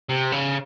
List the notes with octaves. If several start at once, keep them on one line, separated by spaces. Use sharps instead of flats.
C3
C#3